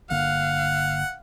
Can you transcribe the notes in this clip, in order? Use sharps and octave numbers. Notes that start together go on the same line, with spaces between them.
G1 D3 A#3 F5 F#5